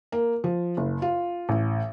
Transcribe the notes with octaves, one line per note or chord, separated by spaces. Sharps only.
A#3
F3
F#1
F4
A1